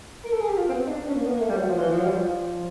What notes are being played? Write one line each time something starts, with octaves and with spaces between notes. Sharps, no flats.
A#4
A4
G#4
G4
F4
C4
B3
D#4
D4
C#4
A#3
B3
A#3
A3
G3
F#3
F3
E3
F3
F#3
G3
F3